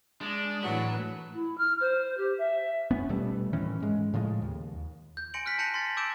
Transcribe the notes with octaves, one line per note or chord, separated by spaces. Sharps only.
G#3 D4
A2 E3 F#3 B4
E4
F6
C5
G4
E5
F#1 B3 C#4
D#1 B2 G3 A3
A2 D#3 E3 C#4
G#2 G#3
A2 C#3 F3 G#3
D#2
G6
G#5 C6 A#6 C#7 D7 F#7
F6 F#6 A#6 B6
A5 G6 A#6 C#7 F7 F#7
C6 A6
D6 E6 G6 A6 D7 E7